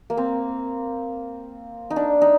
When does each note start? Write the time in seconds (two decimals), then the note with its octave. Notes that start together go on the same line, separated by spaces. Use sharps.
0.10 A#3
0.17 C4
1.90 D#4
1.96 D4
2.22 D#4